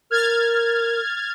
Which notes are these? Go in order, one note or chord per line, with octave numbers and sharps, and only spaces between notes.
A#4 F6 G#6 A6